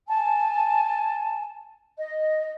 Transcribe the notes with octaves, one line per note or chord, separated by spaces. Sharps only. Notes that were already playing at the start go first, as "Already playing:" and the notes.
G#5 A5
D#5